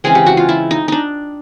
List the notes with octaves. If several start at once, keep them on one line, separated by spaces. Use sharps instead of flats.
C#3 E3 G#3 C4 G#4
G4
F#4
F4
E4
D#4
D4 D#4